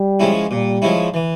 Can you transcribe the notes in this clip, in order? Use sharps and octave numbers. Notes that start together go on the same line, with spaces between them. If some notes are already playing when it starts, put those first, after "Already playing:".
Already playing: G3
F3 G#3 C#4 E4
A#2 G3
F3 G#3 C#4 E4
E3